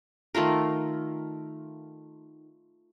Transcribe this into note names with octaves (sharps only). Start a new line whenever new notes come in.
D#3 A3 F4 A#4